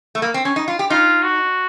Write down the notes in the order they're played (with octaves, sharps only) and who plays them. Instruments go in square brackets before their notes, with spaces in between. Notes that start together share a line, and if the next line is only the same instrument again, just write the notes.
[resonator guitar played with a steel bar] A3
A#3
C4
C#4
D#4
F4
G4
[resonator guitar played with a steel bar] D#4 [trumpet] F4
[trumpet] F#4